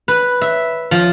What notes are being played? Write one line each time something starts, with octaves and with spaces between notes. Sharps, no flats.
B4
E5
F3